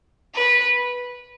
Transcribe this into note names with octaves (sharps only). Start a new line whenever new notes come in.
B4